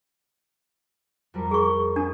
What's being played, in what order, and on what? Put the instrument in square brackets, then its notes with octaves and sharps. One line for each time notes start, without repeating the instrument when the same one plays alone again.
[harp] F2 G3 A#4
[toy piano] G#4 C#6
[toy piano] D4 [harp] D#6